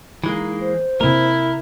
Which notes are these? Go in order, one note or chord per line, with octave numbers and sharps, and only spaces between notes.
E3 G#3 A#3 D#4
C5
C3 A#3 E4 A#4